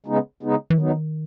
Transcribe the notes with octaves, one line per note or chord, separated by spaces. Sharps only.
C#3 G#3 B3 D#4
C#3 G#3 B3 D#4
E3
D#3 F#3 B3 D#4